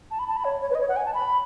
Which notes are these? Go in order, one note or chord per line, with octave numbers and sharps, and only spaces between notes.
A5
B5
A5
B5
C#5
C#5
B4
D#5
C#5
F#5
G#5
A5
B5